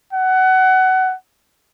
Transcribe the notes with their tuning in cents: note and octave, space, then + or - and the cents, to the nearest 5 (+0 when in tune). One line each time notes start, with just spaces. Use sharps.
F#5 +20